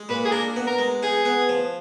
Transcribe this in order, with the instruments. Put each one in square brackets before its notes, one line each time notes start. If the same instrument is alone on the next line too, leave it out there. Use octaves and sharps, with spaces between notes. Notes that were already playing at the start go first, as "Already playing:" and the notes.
Already playing: [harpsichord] G#3
[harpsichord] A#2 [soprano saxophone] B4
[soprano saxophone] G#4
[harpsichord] D4 [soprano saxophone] A#4
[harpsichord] B3
[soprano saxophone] A#4
[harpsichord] G#3
[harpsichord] D#4 [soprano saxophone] G#4
[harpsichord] B3
F3